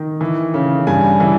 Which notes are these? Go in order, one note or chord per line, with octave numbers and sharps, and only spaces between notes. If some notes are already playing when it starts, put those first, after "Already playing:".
Already playing: D#3
E3
C#3
G2 G#5
E3